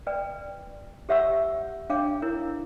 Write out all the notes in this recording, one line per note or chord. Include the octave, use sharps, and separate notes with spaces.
B4 D5 G5
G4 C#5 E5 F#5 C#6 E6
D4 C#5 F5 G5 D6
E4 A#4 C#5